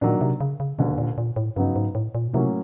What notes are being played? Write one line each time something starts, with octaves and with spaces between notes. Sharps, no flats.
A#2 D#3 F#3 A#3 D4
C3
C#3
C#3
E1 D#2 B2 D3
A#2
A#2
A2
G2 C#3 F#3 B3 D#4
G#2
A2
A#2
B2
A2 C3 F#3 A#3 C#4